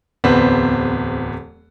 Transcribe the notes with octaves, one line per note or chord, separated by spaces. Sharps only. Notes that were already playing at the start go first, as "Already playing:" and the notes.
D1 E2 B3 C4 B4